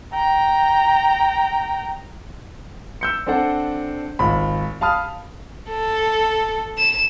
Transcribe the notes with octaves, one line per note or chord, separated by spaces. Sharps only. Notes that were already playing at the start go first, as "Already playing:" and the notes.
G5 A#5
E6 G6 C#7
C4 D4 A4 C5 F#5
G#1 F4 B5
F5 A5 B5 D#6 F6
A4
E7